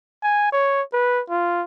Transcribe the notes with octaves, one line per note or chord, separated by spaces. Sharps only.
G#5
C#5
B4
F4